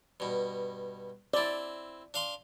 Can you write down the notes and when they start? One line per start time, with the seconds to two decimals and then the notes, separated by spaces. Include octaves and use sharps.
0.20 G2 B2
1.34 C4 E4 D5
2.14 D4 F5 C6